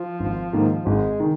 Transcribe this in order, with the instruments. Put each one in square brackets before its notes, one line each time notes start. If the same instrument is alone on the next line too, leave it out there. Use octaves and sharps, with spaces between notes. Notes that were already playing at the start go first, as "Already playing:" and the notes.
Already playing: [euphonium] F3
[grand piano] G#1
G#2 D#3 A#3
[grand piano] G#1 [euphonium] G#3
[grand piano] D#3